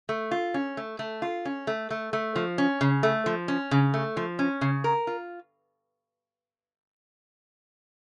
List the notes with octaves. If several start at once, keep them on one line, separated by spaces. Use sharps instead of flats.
A3
F4
C#4
A3
A3
F4
C#4
A3
A3
A3
F3
C#4
C#3
A3
F3
C#4
C#3
A3
F3
C#4
C#3
A#4
F4